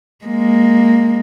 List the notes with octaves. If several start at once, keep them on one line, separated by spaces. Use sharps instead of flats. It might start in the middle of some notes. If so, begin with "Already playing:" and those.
G#3 A#3